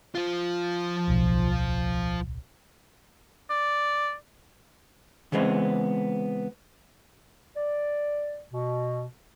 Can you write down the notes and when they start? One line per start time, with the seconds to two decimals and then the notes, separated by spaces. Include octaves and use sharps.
0.15 F3 F4
1.07 D1 B1
3.50 D5
5.32 C#3 E3 G#3 B3 C4
7.56 D5
8.53 B2